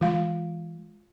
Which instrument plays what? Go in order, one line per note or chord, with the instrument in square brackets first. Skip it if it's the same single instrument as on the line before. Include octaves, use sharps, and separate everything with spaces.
[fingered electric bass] E3 G#3 [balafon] F4 F5